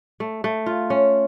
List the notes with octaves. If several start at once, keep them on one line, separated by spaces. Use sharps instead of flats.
A3
A3
F4
C#4